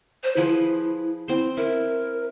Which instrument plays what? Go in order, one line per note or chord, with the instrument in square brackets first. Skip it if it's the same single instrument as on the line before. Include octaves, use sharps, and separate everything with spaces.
[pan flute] C5
[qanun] F3 G#4 B4 [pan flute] E4
[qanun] C4 C5 [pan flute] E4
[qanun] E4 [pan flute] A#4